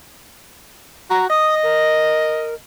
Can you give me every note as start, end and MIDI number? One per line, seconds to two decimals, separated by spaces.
1.10 1.25 66
1.10 1.25 82
1.29 2.56 75
1.29 1.55 87
1.63 2.54 70